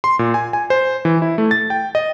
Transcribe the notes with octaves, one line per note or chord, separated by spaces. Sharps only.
C6
A#2
G#5
G#5
C5
E3
E4
A3
A6
G5
D#5